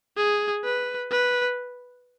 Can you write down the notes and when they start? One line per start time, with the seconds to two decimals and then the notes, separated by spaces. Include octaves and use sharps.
0.17 G#4
0.64 B4
1.11 B4